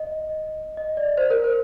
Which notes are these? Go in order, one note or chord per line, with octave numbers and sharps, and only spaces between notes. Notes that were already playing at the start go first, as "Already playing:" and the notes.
Already playing: D#5
D#5
D5
C5
A#4
C5